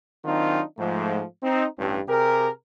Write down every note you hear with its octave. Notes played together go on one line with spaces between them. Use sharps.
D#3 F#3 C4 D4 D#4 F4
G#2 F3 A3
C4 D#4
A1 G2
C3 G4 G#4 A#4